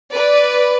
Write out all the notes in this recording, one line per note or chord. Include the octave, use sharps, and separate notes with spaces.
B4 D5